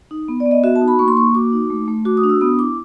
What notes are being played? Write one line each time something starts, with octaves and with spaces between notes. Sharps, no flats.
D#4
B3
D5
B3
D#5
F#4 E5
A5
D#4
B5
A#3 C#6
C6
A#3 C#6
F#4 D6
D#4
A3
A3
F#4 D6
D#6
D4
E6
B3 D#6
E4 D6